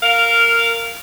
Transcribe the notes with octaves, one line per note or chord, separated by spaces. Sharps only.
A#4 F5